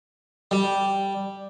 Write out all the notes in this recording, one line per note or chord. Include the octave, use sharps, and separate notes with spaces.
G3